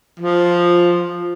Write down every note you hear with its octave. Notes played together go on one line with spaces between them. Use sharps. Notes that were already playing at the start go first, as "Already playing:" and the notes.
F3